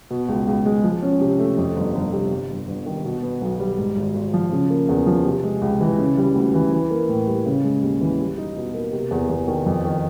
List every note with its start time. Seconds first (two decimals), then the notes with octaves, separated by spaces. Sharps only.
0.10 B2
0.29 C#2
0.47 C#2
0.66 G#3
0.84 F3
1.02 C#4
1.21 C3
1.39 A3
1.58 F2
1.76 G1
1.95 G1
2.13 C3
2.31 G2
2.50 G1
2.68 G1
2.86 D#3
3.05 B2
3.23 B3
3.41 B1
3.60 G3
3.78 G#2
3.96 G#1
4.15 G#1
4.34 F3
4.52 C#3
4.70 A#3
4.89 E2
5.07 F3
5.25 C3
5.44 G#3
5.62 C#2
5.80 E3
5.98 C#3
6.17 G3
6.35 D2
6.54 E3
6.72 E3
6.91 A#3
7.09 A2
7.27 G3
7.46 C#3
7.64 G#3
7.82 D#2
8.01 E3
8.19 G3
8.38 D#4
8.56 B2
8.74 A#3
8.93 C3
9.11 E2
9.29 E2
9.48 D#3
9.66 F2
9.85 D#3